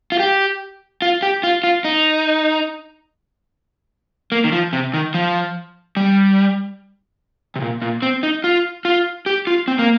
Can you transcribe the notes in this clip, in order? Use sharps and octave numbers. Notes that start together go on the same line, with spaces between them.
F4
G4
F4
G4
F4
F4
D#4
A#3
D#3
F3
C3
D#3
F3
G3
C3
A#2
A#2
C4
D#4
F4
F4
G4
F4
C4
A#3